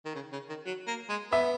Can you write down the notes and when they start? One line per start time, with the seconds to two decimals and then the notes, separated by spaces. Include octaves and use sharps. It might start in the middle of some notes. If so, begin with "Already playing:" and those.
0.05 D#3
0.15 C#3
0.33 C#3
0.49 D#3
0.66 F#3
0.87 A#3
1.09 G#3
1.32 B3 E5